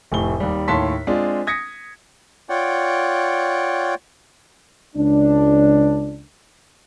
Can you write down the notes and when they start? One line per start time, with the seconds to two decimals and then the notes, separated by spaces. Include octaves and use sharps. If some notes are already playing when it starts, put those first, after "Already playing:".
0.12 F1 A2 G7
0.40 D#2 G3
0.68 D#2 A2 C#5 A5 C6 B6
1.07 G#3 C4 D4 F4
1.47 D#6 G#6 A#6 B6 C#7
2.49 F4 C#5 D5 F#5 G5
4.96 C#2 D4